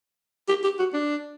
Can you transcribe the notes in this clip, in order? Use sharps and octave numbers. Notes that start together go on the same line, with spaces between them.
G4
G4
F#4
D4